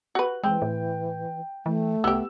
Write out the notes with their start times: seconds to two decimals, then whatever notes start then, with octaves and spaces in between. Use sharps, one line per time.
0.15 F#4 B4
0.44 E3 G#3 C4 G5
0.62 A2
1.66 E3 A3
2.04 C2 B3 G4 E6